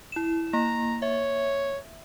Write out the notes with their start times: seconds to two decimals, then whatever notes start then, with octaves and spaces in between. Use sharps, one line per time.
0.12 E4 E7
0.53 A#3 A#5
1.02 C#5 E5